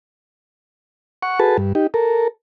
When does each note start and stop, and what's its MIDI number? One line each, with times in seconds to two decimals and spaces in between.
1.23 1.39 78
1.23 1.39 85
1.40 1.57 66
1.40 1.57 68
1.40 1.57 69
1.40 1.57 71
1.40 1.57 81
1.58 1.73 43
1.75 1.87 63
1.75 1.87 67
1.94 2.28 69
1.94 2.28 70